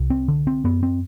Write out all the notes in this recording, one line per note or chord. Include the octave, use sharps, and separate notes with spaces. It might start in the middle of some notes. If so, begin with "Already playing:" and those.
Already playing: C2
C4
D3
C4
F#2 B3
C4